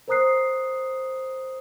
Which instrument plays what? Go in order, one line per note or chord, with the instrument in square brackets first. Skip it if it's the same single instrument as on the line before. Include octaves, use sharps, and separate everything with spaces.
[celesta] A#4 C5 A#5 D#6 F#6 C7